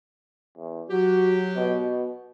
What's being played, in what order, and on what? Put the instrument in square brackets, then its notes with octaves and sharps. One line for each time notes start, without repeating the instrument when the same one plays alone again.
[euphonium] E2
[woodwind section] F#3 G4 [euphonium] F#4
[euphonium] B2